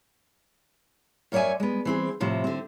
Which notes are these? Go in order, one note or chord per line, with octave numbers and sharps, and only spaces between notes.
F#2 A#4 C#5 D5 E5 G#5
G#3 B3
E3 C4 G#4
A2 C3 F3
D3 C4